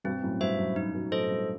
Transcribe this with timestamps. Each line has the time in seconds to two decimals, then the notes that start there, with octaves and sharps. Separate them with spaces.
0.04 G2 B2 C4
0.22 F#2 A2
0.40 G2 F#4 C5 E5
0.58 F#2
0.76 D#4
0.94 G2 B2
1.12 F#2 A2 A4 C5 D#5
1.31 G2